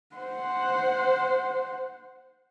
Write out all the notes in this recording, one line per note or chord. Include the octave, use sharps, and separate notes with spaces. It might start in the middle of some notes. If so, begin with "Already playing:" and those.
C5 F#5